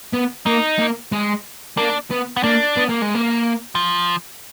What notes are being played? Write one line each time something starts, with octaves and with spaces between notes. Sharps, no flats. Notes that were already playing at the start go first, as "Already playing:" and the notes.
B3
A#3 D#4
A#3
G#3
A#3 D4
B3
B3
A#3 D4
B3
A#3
G#3
A#3
F3